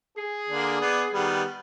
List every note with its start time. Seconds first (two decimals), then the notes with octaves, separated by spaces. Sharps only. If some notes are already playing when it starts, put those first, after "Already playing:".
0.17 G#4
0.49 D3 A#3 D4
0.81 B3 D5
1.13 D#3 G3 B3